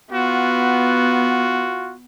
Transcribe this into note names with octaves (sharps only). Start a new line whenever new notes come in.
B3 F4 F#4